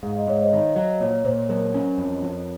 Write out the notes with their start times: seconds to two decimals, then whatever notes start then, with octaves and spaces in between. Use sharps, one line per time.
0.03 G#2 F5
0.17 D#5
0.28 G#2 C#5
0.42 C5 D#5
0.53 D#3
0.76 F#3
1.00 A#2 C#5
1.25 A#2 C5
1.49 F#3 A#4
1.74 C#4
1.98 F2
2.22 F2